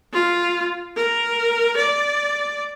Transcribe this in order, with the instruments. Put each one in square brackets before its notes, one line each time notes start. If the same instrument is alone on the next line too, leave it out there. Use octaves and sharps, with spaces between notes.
[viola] F4
A#4
D5